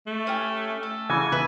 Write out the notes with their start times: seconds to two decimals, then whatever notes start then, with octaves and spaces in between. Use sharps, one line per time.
0.07 A3
0.27 C#4 G4
0.83 A4
1.10 C#3 E3 F#4 G#5
1.32 B3 B4 E5